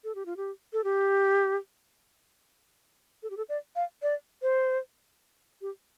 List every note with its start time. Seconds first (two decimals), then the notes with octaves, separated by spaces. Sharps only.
0.04 A4
0.15 G4
0.26 F4
0.37 G4
0.73 A4
0.84 G4
3.23 A4
3.30 G4
3.37 A4
3.49 D5
3.76 F5
4.02 D5
4.42 C5
5.62 G4